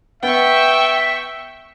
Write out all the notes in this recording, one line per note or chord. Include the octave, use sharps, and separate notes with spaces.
B3 E5 G5 C#6